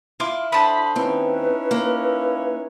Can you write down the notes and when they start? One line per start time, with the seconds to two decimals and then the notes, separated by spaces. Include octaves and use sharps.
0.20 E4 F4 C6 D6
0.52 D3 C5 A5 B5 D#6
0.96 D#2 C4 C#4 D#4 E4 B4
1.71 A#3